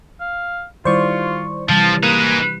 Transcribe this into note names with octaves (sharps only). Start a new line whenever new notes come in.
F5
D#3 G3 E4 F4 C5 D5 C#6
C3 E3 F3 G3 A5
G#3 A#3 D#4 B4